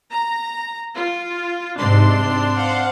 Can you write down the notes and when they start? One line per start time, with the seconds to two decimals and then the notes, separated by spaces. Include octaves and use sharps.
0.10 A#5
0.94 F4
1.77 G#2 C3 C4 D4 C6
2.55 C5 F5 F#5